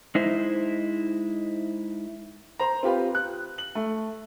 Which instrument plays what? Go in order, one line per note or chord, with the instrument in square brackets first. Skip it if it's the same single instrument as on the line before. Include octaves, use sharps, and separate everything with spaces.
[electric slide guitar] G#3 D#4 E4 C5
[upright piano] C5 A#5
C4 F4 G4 B4
F#6
F#7
A3